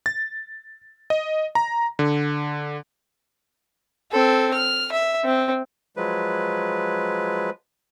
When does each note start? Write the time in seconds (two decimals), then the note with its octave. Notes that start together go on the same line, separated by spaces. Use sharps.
0.06 A6
1.10 D#5
1.55 A#5
1.99 D3
4.12 C4 A4
4.54 F6
4.92 E5
5.25 C4
5.96 F3 F#3 G#3 B4